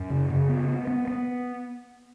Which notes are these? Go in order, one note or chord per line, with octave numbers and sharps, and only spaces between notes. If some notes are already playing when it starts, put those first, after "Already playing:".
Already playing: F#2
C#3
C#3
B3
B3
B3
B3